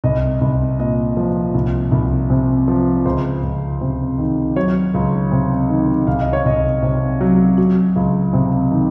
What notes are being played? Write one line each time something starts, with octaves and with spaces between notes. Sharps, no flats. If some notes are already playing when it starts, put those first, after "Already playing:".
C2 D#5
C2
A#2 D#5
F3
C2
C2
C3
F3
C#2 C5
C#2
C3
D#3
F#3 C#5
C#2
C3
D#3
C2 F5
D#5
C#5
C2 D#5
C3
F#3
F#3
C#2
C3
D#3